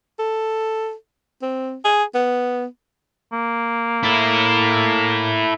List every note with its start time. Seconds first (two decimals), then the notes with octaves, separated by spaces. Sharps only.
0.19 A4
1.42 C4
1.85 G#4
2.14 B3
3.33 A#3
4.03 E4 A4